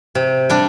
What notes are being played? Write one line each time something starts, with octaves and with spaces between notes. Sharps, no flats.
C3
G3 D4